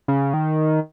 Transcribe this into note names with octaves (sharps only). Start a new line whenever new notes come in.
C#3
D#3